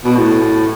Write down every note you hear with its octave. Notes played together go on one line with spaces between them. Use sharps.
B2
A2